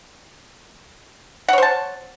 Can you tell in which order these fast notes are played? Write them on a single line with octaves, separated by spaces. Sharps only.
F#5 C#5 C5 A5